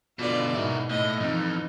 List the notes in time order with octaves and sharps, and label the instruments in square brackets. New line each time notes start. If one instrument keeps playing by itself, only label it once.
[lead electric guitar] B2 D3 [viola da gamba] F4 B4 D5
[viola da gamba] G#2 B2 [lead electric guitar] E4 A#4
[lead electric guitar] A2 [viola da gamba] D#5
[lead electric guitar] F2 [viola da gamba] E3 F3 D#4